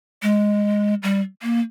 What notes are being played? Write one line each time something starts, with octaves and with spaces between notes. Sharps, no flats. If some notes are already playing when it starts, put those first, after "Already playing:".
G#3
G3
A#3